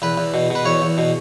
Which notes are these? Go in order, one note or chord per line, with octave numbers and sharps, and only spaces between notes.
E2 B4
E2
B2
B2 B4
E2 C#5
E2
B2